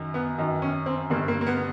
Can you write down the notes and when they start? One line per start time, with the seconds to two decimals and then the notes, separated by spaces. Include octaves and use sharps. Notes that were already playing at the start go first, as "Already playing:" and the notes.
Already playing: F#2 D#3
0.14 B3
0.38 F#2 D#3
0.62 C#4
0.86 C4
1.10 G2 D3 A#3
1.28 A#3
1.41 A#3
1.46 B3
1.57 B3